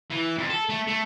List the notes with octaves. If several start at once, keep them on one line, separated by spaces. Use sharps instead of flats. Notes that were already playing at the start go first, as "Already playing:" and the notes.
E3
F2
A4
A3
A3